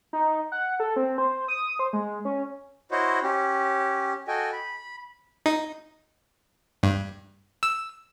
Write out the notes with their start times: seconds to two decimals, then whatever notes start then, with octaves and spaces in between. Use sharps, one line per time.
0.13 D#4
0.52 F#5
0.80 A4
0.96 C4
1.18 C5
1.48 D#6
1.79 C5
1.93 G#3
2.25 C#4
2.91 E4 F#4 C5 C#5 D#5
3.23 C#4 G4
4.28 F#4 A4 D#5 G5 G#5
4.53 B5
5.46 D#4
6.83 G2
7.63 E6